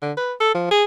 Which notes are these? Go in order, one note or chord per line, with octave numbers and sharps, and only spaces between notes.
D3
B4
A4
F3
G#4